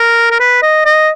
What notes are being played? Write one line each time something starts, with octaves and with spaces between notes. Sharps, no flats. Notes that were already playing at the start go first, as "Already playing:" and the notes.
Already playing: A#4
A#4
B4
D#5
D#5